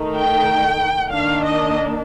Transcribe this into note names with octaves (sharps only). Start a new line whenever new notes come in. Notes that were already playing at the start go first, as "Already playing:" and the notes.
Already playing: D#3 A3 D#4
G5
D#3 A#3 D4 F5
D#5